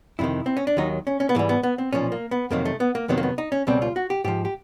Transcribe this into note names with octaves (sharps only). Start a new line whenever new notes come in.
F2 C3 D#3 E4
C4
C#4
D4
D#2 D#3 F#3 D#4
C#4
C#4
B3
G#2 E3 G3 A#3
B3
B3
C4
B1 A#2 F3 C#4
A#3
B3
F2 C3 D#3 F#3 A#3
A3
B3
A#3
F2 C3 D#3 F#3 B3
A#3
B3
D#4
C#4
C#2 B2 G3 C4
F4
F#4
G4
G#2 F3 G4
G4